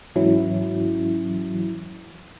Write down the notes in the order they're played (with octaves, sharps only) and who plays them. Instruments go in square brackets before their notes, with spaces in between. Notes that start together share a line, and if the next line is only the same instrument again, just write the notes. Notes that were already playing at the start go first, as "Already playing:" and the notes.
[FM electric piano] G#2 E3 F#3 C#4 E4